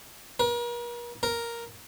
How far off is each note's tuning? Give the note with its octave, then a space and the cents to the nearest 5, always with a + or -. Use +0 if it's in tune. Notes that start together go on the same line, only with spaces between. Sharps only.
A#4 +40
A#4 +0